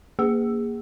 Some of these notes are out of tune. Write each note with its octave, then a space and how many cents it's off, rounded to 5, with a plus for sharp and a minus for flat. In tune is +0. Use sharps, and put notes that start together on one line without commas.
A#3 +0 G#4 -20